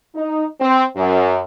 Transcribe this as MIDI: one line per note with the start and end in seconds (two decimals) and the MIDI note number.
0.15 0.44 63
0.60 0.84 60
0.96 1.42 42